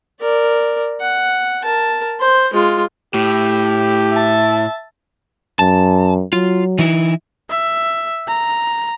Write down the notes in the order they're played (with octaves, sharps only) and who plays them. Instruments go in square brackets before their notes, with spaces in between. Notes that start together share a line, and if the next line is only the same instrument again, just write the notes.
[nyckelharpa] A#4 D5
F#5
A#4 A5
C5
G#3 F4
[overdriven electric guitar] A2 [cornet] G4
[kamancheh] E5 A5
[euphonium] F#2 [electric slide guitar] A5
[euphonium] F#3 [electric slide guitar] F4
[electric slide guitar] E3 D#4 E4
[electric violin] E5
A#5